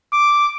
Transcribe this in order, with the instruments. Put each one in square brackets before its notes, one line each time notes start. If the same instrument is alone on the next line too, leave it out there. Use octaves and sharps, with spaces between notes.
[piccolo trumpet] D6